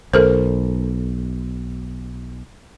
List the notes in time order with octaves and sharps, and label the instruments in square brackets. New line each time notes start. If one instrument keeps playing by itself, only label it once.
[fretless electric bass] B1 [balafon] A4 A#4 C5